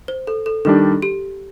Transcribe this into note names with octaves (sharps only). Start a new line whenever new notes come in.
C5
A4
A4
D#3 G3 D4 A4
G4